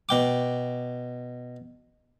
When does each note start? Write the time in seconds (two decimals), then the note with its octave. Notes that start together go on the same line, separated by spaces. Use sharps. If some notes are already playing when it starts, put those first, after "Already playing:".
0.09 B2 G5 D6